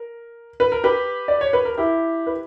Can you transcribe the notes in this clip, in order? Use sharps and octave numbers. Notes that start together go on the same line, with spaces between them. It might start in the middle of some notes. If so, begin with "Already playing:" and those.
Already playing: A#4
B4
A#4
G4 B4
D5
C#5
B4
A#4
E4 G4
B4